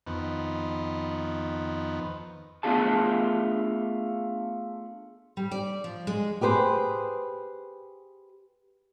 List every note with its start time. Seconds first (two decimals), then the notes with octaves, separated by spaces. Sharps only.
0.07 F2 D#3 B3
2.63 A3 B3 D4 F4 G#4 A5
5.37 G3
5.51 D5
5.84 F3
6.07 G#3
6.41 G4 G#4 B4 C5